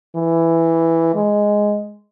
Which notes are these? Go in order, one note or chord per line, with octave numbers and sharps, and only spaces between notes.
E3
G#3